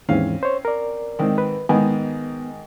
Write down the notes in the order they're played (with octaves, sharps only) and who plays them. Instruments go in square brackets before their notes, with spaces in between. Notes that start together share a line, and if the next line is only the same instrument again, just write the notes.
[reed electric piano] D#2 G#2 E3 [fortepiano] C4 C#4 F5
[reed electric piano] C5 C#5
A#4 D5
[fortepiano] G#2 D#3 C4
[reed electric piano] B4
[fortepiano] G#2 D#3 G#5 [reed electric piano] B3